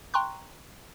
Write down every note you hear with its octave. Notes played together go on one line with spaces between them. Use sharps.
G5 A#5 C6 C#6 F#6